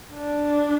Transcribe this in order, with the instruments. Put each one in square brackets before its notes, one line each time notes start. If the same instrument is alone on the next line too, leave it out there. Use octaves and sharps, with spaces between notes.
[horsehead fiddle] D4